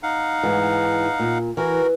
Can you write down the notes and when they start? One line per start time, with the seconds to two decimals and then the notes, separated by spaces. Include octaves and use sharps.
0.03 D#4 F5 F#5
0.43 G#2 E3
1.19 A#2
1.57 E3 F#4 A#4